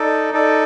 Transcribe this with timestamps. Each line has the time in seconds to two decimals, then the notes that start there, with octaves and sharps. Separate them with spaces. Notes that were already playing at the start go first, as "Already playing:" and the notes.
Already playing: D#4 A4 D5
0.33 D#4 A4 D5